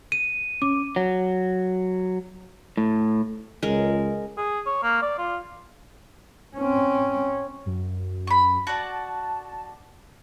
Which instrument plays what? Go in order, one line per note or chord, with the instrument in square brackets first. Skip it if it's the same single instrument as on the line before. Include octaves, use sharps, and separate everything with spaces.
[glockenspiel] D#7
[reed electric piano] C#4 [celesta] D6
[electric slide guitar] F#3
A2
[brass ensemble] C#2 [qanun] G#3 A#4
[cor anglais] G#4
C#5
A#3
D5
F4
[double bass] C4 C#4
[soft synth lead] F#2
[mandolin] B5 C#6
[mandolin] F#4 D5 [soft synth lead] A5